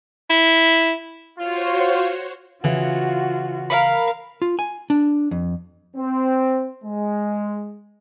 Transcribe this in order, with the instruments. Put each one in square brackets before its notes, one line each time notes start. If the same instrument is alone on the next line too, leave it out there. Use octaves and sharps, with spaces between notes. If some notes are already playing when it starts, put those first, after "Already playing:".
[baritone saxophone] E4
[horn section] F4 [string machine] F#4 C5 C#5
[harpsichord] C#3 E3 [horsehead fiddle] F4 F#4
[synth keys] A#4 B5 [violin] F5
[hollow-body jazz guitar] F4
G#5
D4
F2
[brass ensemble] C4
G#3